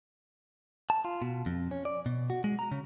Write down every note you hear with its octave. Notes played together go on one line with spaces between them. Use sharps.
A5
F4
B2
F2
C#4
D5
B2
F#4
G#3
A#5
C#3